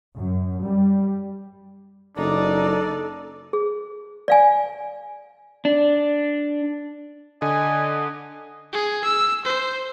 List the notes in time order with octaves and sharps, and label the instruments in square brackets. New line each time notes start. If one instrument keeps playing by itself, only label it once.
[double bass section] F#2
G3
[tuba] F#1 [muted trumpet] D4 [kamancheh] D#4 D5 [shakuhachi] A4
[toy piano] G#4
D5 F5 G#5
[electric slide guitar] D4
[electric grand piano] D3 [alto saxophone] D#5 [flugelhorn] G#5
[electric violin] G#4
E6
C5